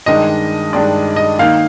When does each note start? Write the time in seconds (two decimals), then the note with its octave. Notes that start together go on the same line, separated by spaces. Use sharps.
0.06 G2 D#3 G#3 D4 D#5
0.73 G2 D#3 G#3 D4 D5
1.16 D#5
1.39 D#3 A#3 D#4 F5